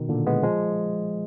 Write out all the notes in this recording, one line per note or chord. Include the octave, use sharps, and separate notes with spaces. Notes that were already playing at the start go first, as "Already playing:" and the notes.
Already playing: B2 D#3
A#2 D3
G#3 B3
F3 G#3